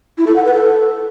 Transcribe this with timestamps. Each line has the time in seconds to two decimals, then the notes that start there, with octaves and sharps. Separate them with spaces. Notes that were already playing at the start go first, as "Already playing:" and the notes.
0.18 E4
0.27 A4
0.36 F#5
0.45 B4
0.54 A4